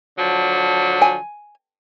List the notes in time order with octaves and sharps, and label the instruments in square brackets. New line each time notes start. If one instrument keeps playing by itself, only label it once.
[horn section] D3 F3 F#3
[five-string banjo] G#5